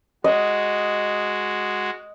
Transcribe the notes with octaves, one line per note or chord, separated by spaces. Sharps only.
G#3 F#4 D#5